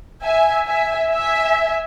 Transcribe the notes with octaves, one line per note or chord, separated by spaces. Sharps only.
E5 G#5
E5 G#5
E5 G#5